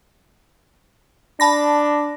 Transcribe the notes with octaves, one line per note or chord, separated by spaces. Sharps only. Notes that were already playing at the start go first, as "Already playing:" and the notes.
D4 A5 B5 A#6